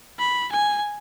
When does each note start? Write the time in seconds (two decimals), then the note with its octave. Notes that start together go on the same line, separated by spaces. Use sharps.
0.19 B5
0.52 G#5